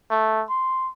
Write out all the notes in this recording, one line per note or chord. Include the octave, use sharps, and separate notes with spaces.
A3
C6